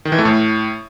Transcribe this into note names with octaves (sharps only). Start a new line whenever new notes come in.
D#3
E3
A3
A2